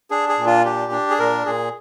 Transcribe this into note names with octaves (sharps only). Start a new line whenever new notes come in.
D4 G#4
G#4
A#2
F4
D4 G4
D4
G#4
A#2 A#4
A#2 G#4